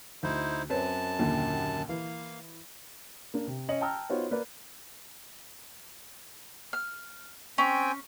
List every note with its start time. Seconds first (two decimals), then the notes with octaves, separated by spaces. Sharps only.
0.23 D2 D#4 E4 C5
0.70 F#2 C4 B4 C#5 A5
1.19 D#2 A#2 D3
1.89 E3 A#3 F5
3.34 A#3 D4
3.47 C3
3.69 C#4 D#5 C#7 F#7
3.81 G5 A5 A#5 E6 F6
4.09 B3 D#4 F4 F#4 C5 C#5
4.31 A#3 B4 D5
6.73 F6
7.58 C4 C#4 G5 G#5